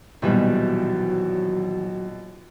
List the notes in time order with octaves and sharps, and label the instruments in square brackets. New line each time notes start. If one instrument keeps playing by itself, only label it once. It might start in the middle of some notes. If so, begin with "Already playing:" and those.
[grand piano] A#1 B2 [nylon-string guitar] D#3 E3 G3 [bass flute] F#3